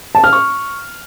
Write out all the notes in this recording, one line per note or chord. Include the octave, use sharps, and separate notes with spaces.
A5
F6
C#6